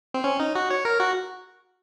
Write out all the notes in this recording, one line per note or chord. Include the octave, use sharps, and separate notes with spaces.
C4
C#4
D#4
F#4
C#5
A#4
F#4